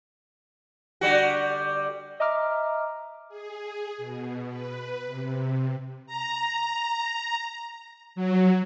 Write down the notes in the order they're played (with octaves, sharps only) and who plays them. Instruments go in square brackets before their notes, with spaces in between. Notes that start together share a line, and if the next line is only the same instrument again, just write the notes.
[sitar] D3 G3 F#4
[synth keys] D#5 E5 A#5 D6 F6
[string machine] G#4
B2
B4
C3
A#5
F#3